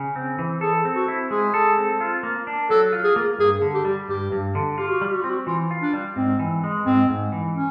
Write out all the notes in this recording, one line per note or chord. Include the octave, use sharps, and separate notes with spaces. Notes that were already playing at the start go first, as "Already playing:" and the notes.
Already playing: C#3
C4
E3
G#4 A4
C4
F#4
E4
G#3 G#4
A4
C4
F4
A#3
D4
F#3 A4
F4
G#4
A#3
G2 G#4
D3
G4
G3
G2 G4
G2
D3
F4 G4
F#4
G3 G4
F#4
C4 F4
F#4
E3 F4
F4
D4
G3
G#2 C4
E3
G#3
G#2 C4
G#2
E3
C#4